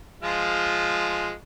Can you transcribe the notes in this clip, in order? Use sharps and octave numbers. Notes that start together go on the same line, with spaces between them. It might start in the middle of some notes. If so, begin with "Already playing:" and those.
F3 G#3 F4